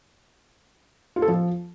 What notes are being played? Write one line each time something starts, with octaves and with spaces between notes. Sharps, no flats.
F4
A4
F3